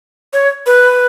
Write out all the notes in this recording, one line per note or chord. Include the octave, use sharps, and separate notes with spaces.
C#5
B4